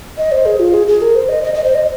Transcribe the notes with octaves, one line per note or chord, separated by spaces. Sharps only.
D#5
C5
G#4
F4
G#4
G#4
A#4
C5
D#5
D#5
D#5
C5
D#5